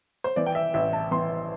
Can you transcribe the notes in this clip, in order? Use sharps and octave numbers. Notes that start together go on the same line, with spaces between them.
C5
E3 D5
G5
E5
A1 E5
A5
E3 C6